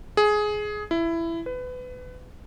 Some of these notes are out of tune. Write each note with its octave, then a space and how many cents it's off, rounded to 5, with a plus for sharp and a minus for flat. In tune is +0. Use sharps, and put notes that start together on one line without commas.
G#4 +15
E4 +15
B4 +25